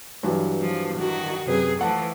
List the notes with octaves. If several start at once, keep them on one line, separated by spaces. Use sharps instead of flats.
G2 E3 F#3
F3
D#3 F#4
F#2 C3 G#4 B4
E3 F3 A3 F#5 A5